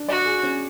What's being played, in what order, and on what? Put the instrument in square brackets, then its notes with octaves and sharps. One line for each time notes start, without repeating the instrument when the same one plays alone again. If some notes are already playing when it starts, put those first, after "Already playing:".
Already playing: [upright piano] D4
[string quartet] F#4 [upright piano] D5
[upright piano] G#4
C#4